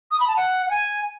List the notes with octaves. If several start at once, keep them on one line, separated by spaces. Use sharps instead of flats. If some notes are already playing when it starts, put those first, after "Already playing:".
D#6
B5
A5
F#5
F#5
G#5